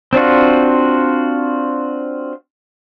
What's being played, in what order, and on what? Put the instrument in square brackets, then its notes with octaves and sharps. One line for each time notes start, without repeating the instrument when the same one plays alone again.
[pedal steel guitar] C4 D4 F4 F#4